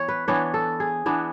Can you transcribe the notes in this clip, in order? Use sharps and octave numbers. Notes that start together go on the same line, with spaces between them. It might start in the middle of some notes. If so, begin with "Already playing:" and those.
Already playing: E3 B3 C#5
B4
E3 B3 D4 C#5
A4
G#4
E3 B3 D4